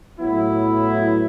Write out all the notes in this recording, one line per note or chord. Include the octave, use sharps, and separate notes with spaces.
A2 F#3 B3 E4